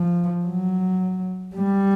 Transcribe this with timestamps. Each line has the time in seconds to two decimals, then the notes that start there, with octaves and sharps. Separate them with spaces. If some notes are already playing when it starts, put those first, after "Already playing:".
Already playing: F3
0.44 F#3
1.56 G3